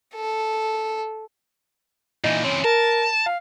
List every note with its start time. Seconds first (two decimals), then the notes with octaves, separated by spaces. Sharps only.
0.16 A4
2.24 A#2 E3 D#4
2.44 E3 C4 C#4
2.64 A#4 A5
3.26 F5